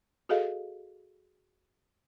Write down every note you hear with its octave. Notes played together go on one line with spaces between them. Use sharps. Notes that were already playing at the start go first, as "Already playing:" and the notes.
F#4 G#4 A4 D#5 F5